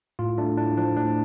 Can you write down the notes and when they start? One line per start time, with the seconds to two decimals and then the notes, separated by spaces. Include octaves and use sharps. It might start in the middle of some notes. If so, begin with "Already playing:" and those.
0.19 A2 F4
0.38 A3 D4
0.57 A2 D4
0.77 F3 D4
0.97 A2 D4